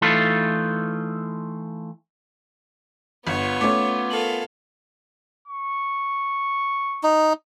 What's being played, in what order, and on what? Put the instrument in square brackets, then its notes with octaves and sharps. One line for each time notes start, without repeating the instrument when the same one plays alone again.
[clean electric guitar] E3 A3 D#4 F4 A4 B4
[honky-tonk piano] G1 [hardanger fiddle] B3 F4 [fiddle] C#5
[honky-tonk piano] A3 C#4 [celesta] D6
[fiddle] A4 F5 [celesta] A#4 F#7
[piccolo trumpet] C#6
[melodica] D#4